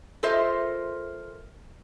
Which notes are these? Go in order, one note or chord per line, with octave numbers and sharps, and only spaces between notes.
F4 A4 A#4 C5 D#5 E5